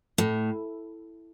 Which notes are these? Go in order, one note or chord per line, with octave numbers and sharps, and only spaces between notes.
A2